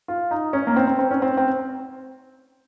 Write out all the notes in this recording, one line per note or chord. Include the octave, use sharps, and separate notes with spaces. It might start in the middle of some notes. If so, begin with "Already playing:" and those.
F4
D#4
C#4
A#3
C4
C4
C4
C#4
C4
C4